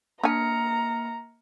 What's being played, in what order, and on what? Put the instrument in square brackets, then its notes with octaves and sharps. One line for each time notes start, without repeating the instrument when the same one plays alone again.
[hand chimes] A#3 F6 C#7 [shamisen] D4 G#5 [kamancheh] A#5